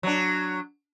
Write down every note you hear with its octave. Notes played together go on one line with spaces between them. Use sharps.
F#3 D4